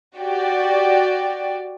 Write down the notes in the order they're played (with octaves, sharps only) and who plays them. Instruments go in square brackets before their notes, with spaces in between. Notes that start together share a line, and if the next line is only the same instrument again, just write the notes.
[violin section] F#4 G4 D5